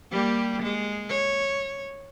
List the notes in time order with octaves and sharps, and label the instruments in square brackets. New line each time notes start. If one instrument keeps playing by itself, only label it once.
[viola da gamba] G3 A#3 G4
G#3
C#5